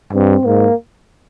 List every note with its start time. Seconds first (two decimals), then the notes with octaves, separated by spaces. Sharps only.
0.13 G2 C4
0.45 G#2 A#3